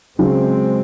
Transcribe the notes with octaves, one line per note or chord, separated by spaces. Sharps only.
C#3 F#3 G#3 C4 C#4